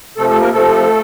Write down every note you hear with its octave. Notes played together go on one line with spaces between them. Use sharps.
C3 F3 A3 A4
A3 A4
A#3 A#4
C3 F3 A3 A4